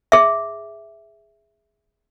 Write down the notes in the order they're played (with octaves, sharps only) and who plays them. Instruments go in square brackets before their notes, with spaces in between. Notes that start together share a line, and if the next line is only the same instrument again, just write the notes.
[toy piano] G#4 E5